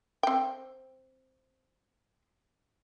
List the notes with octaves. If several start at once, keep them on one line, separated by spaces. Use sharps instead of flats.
C4 G5